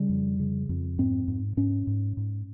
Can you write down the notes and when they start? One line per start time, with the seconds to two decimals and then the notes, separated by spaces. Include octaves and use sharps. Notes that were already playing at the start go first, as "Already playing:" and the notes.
Already playing: C#3 G3
0.09 F2
0.40 C#3
0.69 F2
0.98 G#2 C4
1.28 G#2
1.57 G#2 C#4
1.87 G#2
2.17 G#2